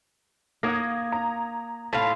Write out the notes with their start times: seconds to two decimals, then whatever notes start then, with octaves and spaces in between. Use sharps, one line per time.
0.63 A#3 F#5 D#6 G#6 A#6
1.12 A#5
1.93 A2 F4 A5